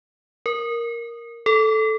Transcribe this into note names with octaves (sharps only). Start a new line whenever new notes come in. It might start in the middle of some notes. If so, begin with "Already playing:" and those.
A#4
A4